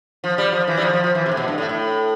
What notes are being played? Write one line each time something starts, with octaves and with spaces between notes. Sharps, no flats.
F3
G3
F3
E3
G3
F3
F3
F3
E3
C3
A2
B2
G2
A2
A2